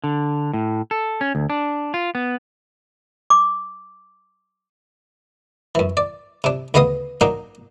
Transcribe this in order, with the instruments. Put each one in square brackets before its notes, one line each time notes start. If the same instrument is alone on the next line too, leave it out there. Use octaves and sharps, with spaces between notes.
[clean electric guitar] D3
A2
A4
C#4
D2
D4
F4
B3
[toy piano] D6
[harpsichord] F#2 E3
D5
C3 D4
D2 C#3 B3 D#5 F5 D#6
F#3 A#3 D4 D#4